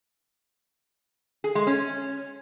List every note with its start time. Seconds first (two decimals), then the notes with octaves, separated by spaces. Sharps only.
1.44 G#4
1.55 G#3
1.67 C#4